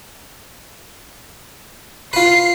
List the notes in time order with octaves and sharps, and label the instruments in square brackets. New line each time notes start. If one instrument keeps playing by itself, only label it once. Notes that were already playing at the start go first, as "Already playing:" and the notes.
[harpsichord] F4 B4 [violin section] C7